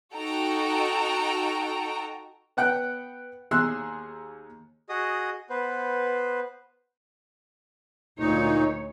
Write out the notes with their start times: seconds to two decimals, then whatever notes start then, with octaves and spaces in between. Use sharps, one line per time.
0.15 D#4 F#4 A4 G5 A#5
2.57 B3 F#5 G5 F#6
3.51 D#2 G#4 C6 E6 F#6
4.89 F#4 G#4 D#5 D#6
5.50 B3 B4 C5
8.19 D2 A#2 D#4 C#5